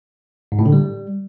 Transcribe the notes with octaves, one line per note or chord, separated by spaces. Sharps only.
G#2
A2
D3
G3